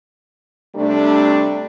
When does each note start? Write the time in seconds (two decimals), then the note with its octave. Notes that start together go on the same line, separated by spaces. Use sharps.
0.75 C3 G3 A3 D4